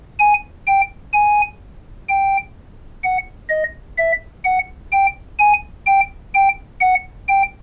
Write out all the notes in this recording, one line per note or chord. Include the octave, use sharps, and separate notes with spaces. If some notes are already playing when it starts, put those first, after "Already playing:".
G#5
G5
G#5
G5
F#5
D#5
E5
F#5
G5
G#5
G5
G5
F#5
G5